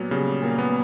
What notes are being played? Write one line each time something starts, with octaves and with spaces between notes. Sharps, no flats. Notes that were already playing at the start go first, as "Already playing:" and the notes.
Already playing: A#2 F#3 A#3 B3
C#3 G3
A#2 A#3
B3